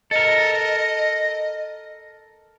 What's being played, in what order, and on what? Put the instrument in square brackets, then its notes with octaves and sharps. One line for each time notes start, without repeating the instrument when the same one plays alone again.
[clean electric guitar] A4 A#4 [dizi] D#5